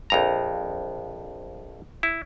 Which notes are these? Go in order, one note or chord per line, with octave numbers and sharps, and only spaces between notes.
A#1 F2 A#5
E4